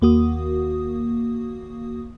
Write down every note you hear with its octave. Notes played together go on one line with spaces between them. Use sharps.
D#2 A#3 F#4 D#6